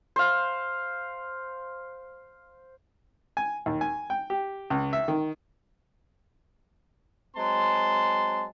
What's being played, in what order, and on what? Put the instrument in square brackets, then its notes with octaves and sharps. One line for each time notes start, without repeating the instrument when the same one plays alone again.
[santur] C5 F5
[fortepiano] G#5
D#2
G#5
G5
G4
C#2
E5
D#3
[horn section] F#3 G#3 C4 A5 C6